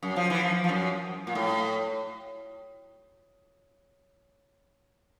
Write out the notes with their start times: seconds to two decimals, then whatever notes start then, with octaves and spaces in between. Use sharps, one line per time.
0.03 F#2
0.16 F3
0.30 E3
0.43 F3
0.64 F3
0.69 F#2
1.27 A#2
1.35 A2